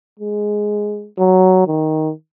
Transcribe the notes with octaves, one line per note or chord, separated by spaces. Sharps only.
G#3
F#3
D#3